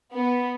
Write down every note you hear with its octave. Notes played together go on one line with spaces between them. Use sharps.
B3